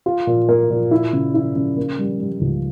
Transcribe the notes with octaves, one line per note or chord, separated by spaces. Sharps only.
F4
A#2
A#3
A#2
E4
C#3
E4
C#3
A#3
G3
G3
C#2